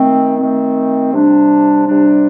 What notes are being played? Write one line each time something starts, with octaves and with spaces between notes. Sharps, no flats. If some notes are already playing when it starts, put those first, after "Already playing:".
Already playing: D#3 A3 C4
D#3 A3 C4
C3 G3 D4
C3 G3 D4